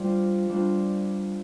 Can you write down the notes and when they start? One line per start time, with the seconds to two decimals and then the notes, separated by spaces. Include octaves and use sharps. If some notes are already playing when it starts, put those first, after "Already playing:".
Already playing: G3 D4 F4 C5
0.49 G3 D4 F4 C5